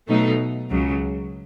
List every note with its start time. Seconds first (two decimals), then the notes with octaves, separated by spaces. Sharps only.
0.08 B2 F#3 A3 D#4
0.70 C#2 C#3 F#3